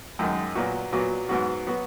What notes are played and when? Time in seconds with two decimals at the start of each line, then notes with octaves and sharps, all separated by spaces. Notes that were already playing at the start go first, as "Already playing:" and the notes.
0.19 F#2 D#3 G#3
0.55 A#2 F#3 B3 F#4
0.92 A#2 F#3 B3 F#4
1.29 G#2 F#3 B3 F#4
1.67 F#3 B3 F#4